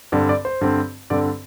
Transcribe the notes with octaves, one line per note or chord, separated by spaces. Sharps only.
G2 D3 C4 D5
D5
C5
G2 D3 C4
G2 D3 C4 D5